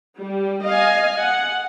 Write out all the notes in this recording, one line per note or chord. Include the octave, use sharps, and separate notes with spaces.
G3
D#5 F5 G#5
F#5